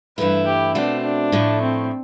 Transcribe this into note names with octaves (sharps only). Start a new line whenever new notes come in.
G2 E3 A3 E4 B4
G4
B2 A3 C4 D4
D4
A2 F3 A3
C4